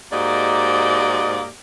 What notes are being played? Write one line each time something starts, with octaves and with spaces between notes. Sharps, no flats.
G#2 A#3 F#4 G4 D5 D#5